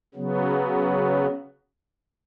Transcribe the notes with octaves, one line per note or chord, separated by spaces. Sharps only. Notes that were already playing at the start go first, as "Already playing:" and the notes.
C#3 F#3 B3